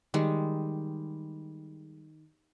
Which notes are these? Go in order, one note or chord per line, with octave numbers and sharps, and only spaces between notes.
D#3 G3 G#3